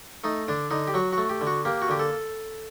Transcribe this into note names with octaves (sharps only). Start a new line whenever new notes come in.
A3 D#4
D3 D4
D3 D#4
G4
F#3 F#4
A3 F#4
G4
D3
F#4
A#3 G4
F#4
D3 G4
A4